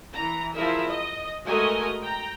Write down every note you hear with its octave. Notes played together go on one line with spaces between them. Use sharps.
E3 A#5
F3 E4 G#4 A#4 E5
D#5
G#3 A3 F#4 A#4 D#5 G#5
G5 A#5